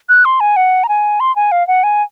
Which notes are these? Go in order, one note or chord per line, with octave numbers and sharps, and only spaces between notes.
F#6
C6
G#5
F#5
A#5
G#5
C6
G#5
F5
F#5
G#5